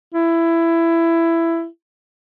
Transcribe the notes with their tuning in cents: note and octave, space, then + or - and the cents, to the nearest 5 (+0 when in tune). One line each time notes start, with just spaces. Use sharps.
E4 +15